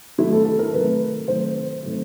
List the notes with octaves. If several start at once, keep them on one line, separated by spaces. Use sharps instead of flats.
C3 D#3 F#3 A3 E4
A4
A4
A#4
C3 D#3 F#3 A3 B4
C3 D#3 F#3 A3 C5
C3 D#3 F#3 A3